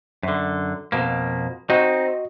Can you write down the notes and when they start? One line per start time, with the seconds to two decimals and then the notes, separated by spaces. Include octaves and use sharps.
0.23 F#2 D3
0.92 F2 B2 A#3
1.70 C4 D#4 F#4 D#5